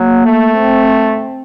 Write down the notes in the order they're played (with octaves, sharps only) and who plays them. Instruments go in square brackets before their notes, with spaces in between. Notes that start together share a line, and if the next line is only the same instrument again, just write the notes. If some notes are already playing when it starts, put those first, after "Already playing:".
Already playing: [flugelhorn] F#3 [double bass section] A#3
[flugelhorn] A3
[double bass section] C4